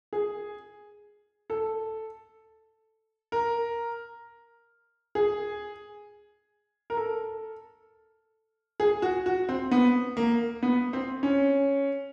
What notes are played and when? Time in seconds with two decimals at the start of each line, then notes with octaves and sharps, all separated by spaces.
0.13 G#4
1.50 A4
3.32 A#4
5.15 G#4
6.90 A#4
6.97 A4
8.80 G#4
9.02 F#4
9.26 F#4
9.49 C4
9.71 B3
10.17 A#3
10.63 B3
10.93 C4
11.23 C#4